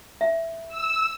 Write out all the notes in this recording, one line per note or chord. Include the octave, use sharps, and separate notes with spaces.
E5
E6